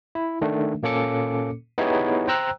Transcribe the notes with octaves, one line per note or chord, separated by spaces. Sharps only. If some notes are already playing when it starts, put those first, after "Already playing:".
E4
D#3 A3 D4
A#2 A#3 C#4 A4 D6 C#7
B3 D#4 E4 G4 G#4 C#5
C5 G5 A#5 E6 F#6